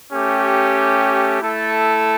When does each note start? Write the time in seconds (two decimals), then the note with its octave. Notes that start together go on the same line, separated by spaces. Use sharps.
0.11 A3 C#4 G4
1.41 A3 E4 A4